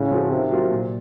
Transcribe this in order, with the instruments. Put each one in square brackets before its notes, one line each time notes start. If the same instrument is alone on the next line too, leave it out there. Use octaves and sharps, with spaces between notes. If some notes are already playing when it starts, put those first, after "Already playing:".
Already playing: [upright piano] A2 [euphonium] C#3
[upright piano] F3 C4 F#4 A4
[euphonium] C3 [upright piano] D#3
[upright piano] F#3 A#3 F4
A#2